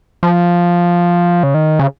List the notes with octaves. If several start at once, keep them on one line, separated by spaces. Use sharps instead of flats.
F3
C#3
D#3
C#3